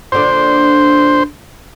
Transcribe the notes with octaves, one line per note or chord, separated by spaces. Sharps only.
A#2 D3 D4 C5